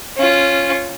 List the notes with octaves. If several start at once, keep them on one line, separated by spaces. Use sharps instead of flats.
C#4 F4